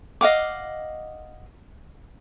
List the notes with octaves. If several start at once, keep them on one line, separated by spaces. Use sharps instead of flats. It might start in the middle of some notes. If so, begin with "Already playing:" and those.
D#5 F5 F#5 D6